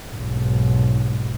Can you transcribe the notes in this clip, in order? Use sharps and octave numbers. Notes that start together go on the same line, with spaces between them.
B1 G#2